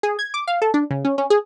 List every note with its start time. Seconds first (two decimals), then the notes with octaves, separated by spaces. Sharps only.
0.03 G#4
0.19 G#6
0.34 D6
0.47 F5
0.62 A4
0.74 D4
0.91 C#3
1.05 C#4
1.18 C#4
1.30 G#4